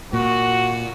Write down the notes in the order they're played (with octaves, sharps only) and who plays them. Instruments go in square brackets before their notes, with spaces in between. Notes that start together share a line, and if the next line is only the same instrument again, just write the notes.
[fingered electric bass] A#2 [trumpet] F#4